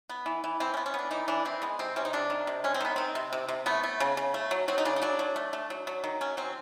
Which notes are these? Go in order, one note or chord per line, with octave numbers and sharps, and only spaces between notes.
B3
E3
E3
E3 C4
C#4
B3
C#4
B3 D4
E3 D#4
E3 D4
E3 C4
G#3 B3
C3 C4
C3 C#4
D#4
C3 D4
D#3
C3
G#3 C#4
C4
D#3 B3
D#3 C4
C3
C3
C3
A3 B3
A3
C#3
C#3
A3
F#3
F#3 C4
D#4
C#3 D4
D#4
F#3 D4
F#3
A3
A3
F#3
F#3
D#3
F#3 C#4
F#3 C4